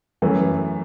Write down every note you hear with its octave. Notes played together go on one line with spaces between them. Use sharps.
F#2 E3 A3